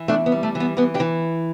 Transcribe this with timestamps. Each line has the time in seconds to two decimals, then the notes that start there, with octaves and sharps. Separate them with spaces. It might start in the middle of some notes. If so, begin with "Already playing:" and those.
Already playing: E3
0.08 E2 A3 D4
0.26 B3
0.32 G3
0.43 A3
0.55 E3
0.60 B3
0.77 E3 B3
0.94 D4 G4
1.00 E3